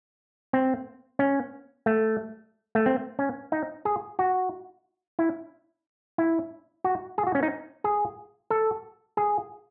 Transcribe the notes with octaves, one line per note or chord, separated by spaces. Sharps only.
C4
C#4
A3
A3
C4
C#4
D#4
G#4
F#4
E4
E4
F#4
G#4
F#4
C#4
D#4
G#4
A4
G#4